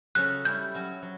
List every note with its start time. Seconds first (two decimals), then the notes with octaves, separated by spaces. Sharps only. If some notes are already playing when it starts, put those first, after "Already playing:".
0.15 C#3 F#3 C#4 F#4 A4 F#6
0.44 G3 C#4 E4 G6
0.74 F#3 C#4 F#4
1.03 F#3